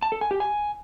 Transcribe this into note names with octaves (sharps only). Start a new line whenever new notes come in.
A5
A4
G#5
G4
G#5